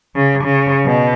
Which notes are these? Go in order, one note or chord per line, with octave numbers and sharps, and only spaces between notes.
C#3
C#3
B2